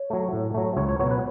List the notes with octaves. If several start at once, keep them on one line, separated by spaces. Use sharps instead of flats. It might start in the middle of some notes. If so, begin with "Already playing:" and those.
Already playing: C#5
F#3 A3
A2
F#3 A3
C#2 C#5
C#5
B2 F#3 B3 C#5
B4